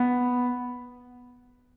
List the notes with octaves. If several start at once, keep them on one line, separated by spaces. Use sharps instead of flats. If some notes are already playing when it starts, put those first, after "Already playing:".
Already playing: B3